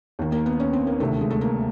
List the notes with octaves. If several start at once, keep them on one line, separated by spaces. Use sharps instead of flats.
D#2 D#3
A#3
B3
C#4
C4
A#3
D2 C3 D#3 A3
G#3
A3
A#3